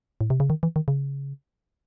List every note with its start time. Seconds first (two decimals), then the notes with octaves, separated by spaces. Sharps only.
0.21 A2
0.30 C3
0.40 C#3
0.50 D#3
0.63 E3
0.76 D#3
0.88 C#3